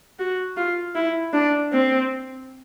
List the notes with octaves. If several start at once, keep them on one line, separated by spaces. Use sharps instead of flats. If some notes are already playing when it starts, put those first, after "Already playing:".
F#4
F4
E4
D4
C4